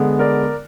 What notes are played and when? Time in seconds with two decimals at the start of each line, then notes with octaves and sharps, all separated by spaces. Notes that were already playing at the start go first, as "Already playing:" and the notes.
Already playing: D3 G#3 B3
0.19 A#4 D5